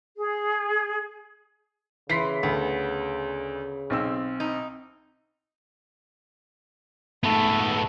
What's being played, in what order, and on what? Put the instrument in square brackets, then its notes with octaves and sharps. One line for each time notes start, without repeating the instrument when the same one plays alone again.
[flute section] G#4
[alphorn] C#3 [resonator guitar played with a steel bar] E3 [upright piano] C6 B6 C7
[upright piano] D2 [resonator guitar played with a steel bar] B3
[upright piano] B1 C4 E6
[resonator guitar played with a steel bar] D#4
[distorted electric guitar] G#2 B3 [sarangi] A3